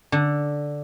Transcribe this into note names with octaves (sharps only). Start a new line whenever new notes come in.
D3